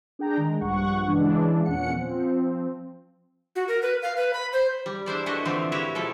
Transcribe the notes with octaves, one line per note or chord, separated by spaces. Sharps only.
D4 G#4 G5 A#5
D#3 G#3
A#1 G2 F#5 C#6
C#3 E3 G#3 D4
E2 A#2 C#4 F#5 C#7
F3 C4
F#4
A#4
B4
F5
B4
B5
C5
G3
D4 E4 C5 D5
A3 D4 E4 F#4 B4 D#5
D3 E3 F3 A3 C4
E4 F#4 G4 B4 C#5 E5
B2 F3 E4 A4